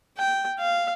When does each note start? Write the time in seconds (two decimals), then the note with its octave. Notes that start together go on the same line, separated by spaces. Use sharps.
0.17 G5
0.59 F5